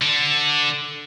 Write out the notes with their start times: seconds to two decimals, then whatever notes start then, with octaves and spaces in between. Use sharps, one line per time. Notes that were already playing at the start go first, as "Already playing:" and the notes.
0.01 D3